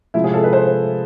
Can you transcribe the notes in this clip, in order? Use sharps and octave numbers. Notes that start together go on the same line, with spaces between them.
C3 F3 G#3 E4
G#4
A4
B4
C5